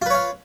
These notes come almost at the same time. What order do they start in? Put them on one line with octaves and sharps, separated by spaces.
F4 B4 C#5 F5